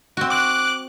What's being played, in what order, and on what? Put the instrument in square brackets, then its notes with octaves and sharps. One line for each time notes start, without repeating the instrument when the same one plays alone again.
[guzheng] C4 F#4
[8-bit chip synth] D6 F#6